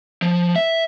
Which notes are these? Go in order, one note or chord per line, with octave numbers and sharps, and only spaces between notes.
F3
E5